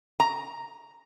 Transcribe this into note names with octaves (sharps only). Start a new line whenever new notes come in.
A#5